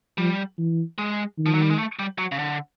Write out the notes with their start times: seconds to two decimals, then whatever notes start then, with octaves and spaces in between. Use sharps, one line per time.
0.18 F3 G3
0.58 E3
0.98 G#3
1.38 D#3
1.46 F3
1.54 F#3
1.62 G3
1.70 G#3
1.78 A3
1.99 G3
2.18 F#3
2.32 C#3
2.39 D3